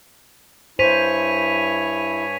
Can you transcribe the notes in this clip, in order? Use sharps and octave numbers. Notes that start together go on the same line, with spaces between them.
G2 E4 C5 C#5 G#5 B6 D#7 F7